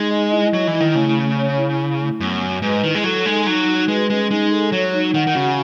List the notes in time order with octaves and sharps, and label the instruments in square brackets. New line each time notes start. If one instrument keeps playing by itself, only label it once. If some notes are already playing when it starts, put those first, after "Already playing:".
Already playing: [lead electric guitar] G#3 [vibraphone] D#4
[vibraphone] D#5
E4
[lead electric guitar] F#3 [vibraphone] D#5
[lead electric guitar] E3
[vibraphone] E4
[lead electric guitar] D#3
[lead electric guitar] C#3 [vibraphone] A3
[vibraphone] C#4
C#5
E4
E4
A3
[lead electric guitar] F#2 [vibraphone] B3
[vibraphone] F#4
[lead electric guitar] G#2 [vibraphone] B4
[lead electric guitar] D#3 [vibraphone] E4
[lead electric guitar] G#3
[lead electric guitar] F#3 [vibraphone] A4
[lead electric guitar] G#3 [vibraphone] D#4
[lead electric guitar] F#3 [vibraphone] D#4
[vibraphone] F#4
[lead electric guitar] G#3 [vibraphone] B4
[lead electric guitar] G#3 [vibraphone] C#4
[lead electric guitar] G#3 [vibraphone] D#4
[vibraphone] A4
[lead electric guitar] F#3 [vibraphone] C#5
[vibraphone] D#4
[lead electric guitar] D#3 [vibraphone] F#5
[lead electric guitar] D#3
[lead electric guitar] C#3 [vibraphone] F#4